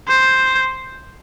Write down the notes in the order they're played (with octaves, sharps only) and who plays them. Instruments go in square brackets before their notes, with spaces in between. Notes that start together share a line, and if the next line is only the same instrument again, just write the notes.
[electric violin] C5